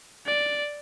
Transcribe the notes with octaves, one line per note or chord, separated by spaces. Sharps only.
D5